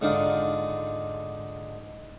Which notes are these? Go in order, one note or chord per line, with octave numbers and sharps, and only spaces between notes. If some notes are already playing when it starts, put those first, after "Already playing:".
G#2 D3 D4 D#4 F4